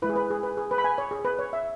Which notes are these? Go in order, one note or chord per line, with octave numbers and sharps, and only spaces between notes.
G#3 E4 B4
G#4
B4
G#4
B4
G#4
B4
B5
G#5
C#5
G#4
B4
C#5
E5